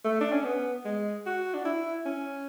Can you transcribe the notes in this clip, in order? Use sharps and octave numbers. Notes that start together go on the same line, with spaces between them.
A3
D4
C#4
B3
G#3
F#4
D4
E4
C#4